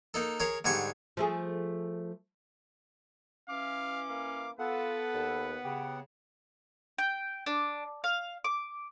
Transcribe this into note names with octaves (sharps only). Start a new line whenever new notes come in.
A#3 D#4 A4
G#4 A#4 C#5 F5
G#2 D3 G3 G#5 C#6
F3 A3 G#4
E3 C#4 F5 D6
A#3 F5
B3 F4 A4 B4 F#5
D#2
C#3 G4
G5
D4
F5
D6